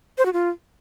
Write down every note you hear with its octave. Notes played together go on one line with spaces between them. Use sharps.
C5
F#4
F4